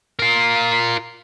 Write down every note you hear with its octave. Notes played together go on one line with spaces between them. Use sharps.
F4 A#4